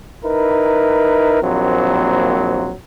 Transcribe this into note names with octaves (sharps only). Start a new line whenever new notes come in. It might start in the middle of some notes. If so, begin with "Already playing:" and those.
D#4 E4 A#4 B4
A#1 D#2 F#3 C4